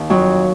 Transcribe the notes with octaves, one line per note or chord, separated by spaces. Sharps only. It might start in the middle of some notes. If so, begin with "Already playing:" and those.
Already playing: D#2 D#3
F2 F#3